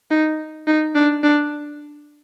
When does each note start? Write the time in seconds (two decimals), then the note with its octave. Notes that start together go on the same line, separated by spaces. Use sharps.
0.11 D#4
0.67 D#4
0.95 D4
1.23 D4